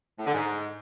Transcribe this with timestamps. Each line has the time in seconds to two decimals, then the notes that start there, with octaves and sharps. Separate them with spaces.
0.18 A2
0.26 D3
0.34 G#2